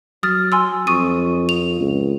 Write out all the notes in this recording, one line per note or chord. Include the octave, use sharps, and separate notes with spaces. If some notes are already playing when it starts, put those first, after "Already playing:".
F#3 D#6 F6 A6
G#5 C6 E6
F2 C#6 D#6 D#7
F7
C#2